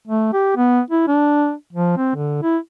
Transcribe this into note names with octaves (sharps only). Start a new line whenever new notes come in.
A3
G4
B3
E4
D4
F3
C4
D3
E4